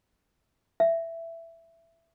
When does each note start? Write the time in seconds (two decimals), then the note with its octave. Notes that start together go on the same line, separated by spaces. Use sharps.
0.80 E5